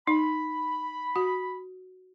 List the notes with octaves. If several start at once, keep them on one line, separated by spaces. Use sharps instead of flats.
D#4 B5
F#4